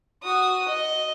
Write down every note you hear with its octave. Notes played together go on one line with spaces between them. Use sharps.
F#4 D#6
D#5